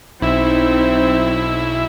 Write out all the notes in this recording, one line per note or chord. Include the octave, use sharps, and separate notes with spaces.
B1 C4 D#4 E4 E6